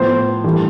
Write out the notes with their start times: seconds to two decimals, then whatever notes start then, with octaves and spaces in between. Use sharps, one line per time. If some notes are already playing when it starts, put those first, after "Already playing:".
Already playing: A2 F3 B3 C5
0.44 G2 E3 A3